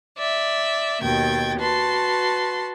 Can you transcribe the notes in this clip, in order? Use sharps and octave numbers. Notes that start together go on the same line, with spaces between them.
D5 E5
D#2 B2 G5 G#6 A6
F#4 B4 A5 C6